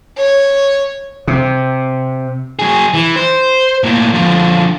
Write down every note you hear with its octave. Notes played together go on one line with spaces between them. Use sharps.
C#5
C3
F#3 G#4
E3
C5
A2 A#3
D3 F3